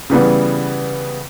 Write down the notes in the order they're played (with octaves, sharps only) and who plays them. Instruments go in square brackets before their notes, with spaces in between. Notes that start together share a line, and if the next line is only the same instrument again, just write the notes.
[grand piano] C#3 E3 G3 B3